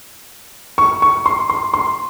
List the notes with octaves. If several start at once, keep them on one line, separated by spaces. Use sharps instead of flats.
C#6
C#6
C6
C6
C6